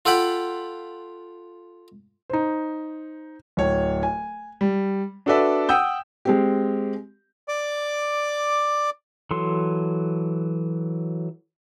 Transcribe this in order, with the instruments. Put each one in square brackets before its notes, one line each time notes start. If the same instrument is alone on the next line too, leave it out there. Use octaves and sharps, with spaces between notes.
[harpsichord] F4 A4 F#5 G5 B5
[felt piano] D#4 C5
[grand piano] D1 C#5
G#5
G3
D4 F#4 A4 B4 D5 E5
F#5 G5 D#6 E6 G6
[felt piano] G#3 C4 G4
[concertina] D5 D6
[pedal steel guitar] E3 F#3 A4 C6